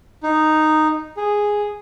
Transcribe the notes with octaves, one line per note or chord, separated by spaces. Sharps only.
D#4
G#4